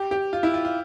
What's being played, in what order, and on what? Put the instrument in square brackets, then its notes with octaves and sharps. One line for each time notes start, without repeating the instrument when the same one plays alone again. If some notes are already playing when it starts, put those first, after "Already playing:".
Already playing: [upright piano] G4
G4
F4
E4
F4
F4